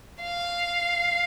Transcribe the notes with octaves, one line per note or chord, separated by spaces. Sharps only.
F5